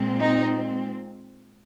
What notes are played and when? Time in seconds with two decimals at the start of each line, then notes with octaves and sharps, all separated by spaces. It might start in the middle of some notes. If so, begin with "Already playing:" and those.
Already playing: A#2 G#3 C4
0.19 D#4